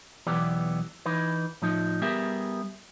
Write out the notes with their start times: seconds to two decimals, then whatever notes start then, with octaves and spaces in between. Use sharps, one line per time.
0.27 B1 E2 E3 B3 G4 D5
1.06 E3 D#4 B4
1.62 A2 F3 D#4
2.02 G3 B3 G4 G#4 A#4 E5